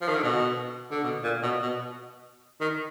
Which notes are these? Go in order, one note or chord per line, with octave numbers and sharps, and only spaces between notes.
F3
D#3
D3
B2
D3
B2
A#2
B2
B2
D#3